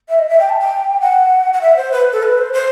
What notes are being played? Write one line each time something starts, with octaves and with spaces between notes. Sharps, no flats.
E5
D#5
E5
G5
A5
G5
F#5
F#5
E5
C5
B4
A4
B4
C5
C5